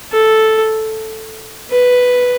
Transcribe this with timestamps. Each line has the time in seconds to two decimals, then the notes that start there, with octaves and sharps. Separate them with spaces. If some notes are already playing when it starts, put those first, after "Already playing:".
0.12 A4
1.71 B4